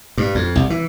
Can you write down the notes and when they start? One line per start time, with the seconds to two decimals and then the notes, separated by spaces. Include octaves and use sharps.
0.18 G2
0.35 F2
0.56 C2
0.70 E3